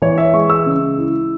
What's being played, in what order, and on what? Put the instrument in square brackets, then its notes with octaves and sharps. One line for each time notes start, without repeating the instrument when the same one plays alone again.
[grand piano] E3 C#5
E5
G#3 C#6
E6
C#3
E4